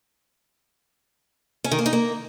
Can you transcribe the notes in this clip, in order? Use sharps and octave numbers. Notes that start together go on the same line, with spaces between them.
C#4
D#3
A#3
D#4
A#3